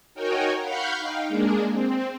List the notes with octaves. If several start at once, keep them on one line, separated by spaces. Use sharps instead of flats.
D#4 F#4 A#4 C#5 G5 G#5
F5 F#5 B5 C#6 F6 G6
D#4 F5 G5
G#3 A#3 D4 G#4
C4